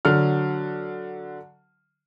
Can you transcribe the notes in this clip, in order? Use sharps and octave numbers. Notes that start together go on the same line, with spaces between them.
D3 F#3 F6